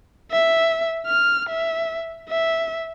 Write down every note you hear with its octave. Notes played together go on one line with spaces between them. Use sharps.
E5
F6
E5
E5